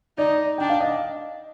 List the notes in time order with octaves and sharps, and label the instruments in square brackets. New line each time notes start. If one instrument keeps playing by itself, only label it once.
[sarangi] D#4 [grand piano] D5
[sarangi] D4 [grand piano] G5
[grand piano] F5
D#5